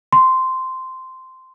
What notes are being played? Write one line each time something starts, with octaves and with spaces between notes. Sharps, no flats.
C6